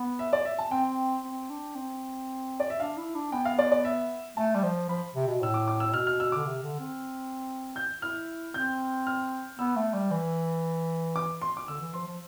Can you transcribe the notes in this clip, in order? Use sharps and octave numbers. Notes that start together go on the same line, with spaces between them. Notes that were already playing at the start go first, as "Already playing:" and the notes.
Already playing: B3
E5
D5
E5
A5
C4 G5
C4
D4
C4
D5
E5
D4 F5
E4
D4
B3 G5
F5
D5
D5
E5
A3 A5
G3
F3
F3 B5
C3
B2
A2 E6
D6
D6
E6
A2
B2 F6
F6
E6
D3 D6
C3
D3
C4
G6
E4 F6
C4 G6
F6
B3 E6
A3
G3
E3
D6
C6
D6
D3 E6
E3
F3 C6
F3